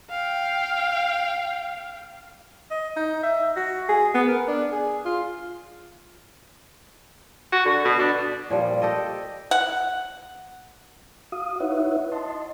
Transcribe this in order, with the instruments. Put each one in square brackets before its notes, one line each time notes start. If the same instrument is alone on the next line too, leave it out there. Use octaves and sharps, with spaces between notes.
[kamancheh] F5 G5
[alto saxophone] D#5
D#4
E5
F#4
G#4
B3
A#4
D4
G#4
F4
[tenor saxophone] F#4
D3
B2
D4
[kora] A#2 F3 G3
G4 A4 D#5
[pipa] F#5
[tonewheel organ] F#4 F5 D#6
D#4 E4 B4 C#5 E5 F#5
D#5 A5 C6